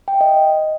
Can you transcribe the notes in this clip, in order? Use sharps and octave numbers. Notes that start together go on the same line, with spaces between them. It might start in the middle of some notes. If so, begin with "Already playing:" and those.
G5
E5
D#5